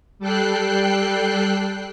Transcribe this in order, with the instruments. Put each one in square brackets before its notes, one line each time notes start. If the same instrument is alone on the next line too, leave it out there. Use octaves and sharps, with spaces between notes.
[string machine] G3 A4 G5 F#6 C7